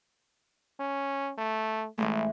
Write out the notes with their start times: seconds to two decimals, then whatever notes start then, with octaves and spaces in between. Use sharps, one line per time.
0.79 C#4
1.38 A3
1.98 A1 E3 G#3 A3